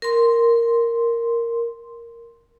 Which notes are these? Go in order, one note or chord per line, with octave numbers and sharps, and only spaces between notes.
A#4 C6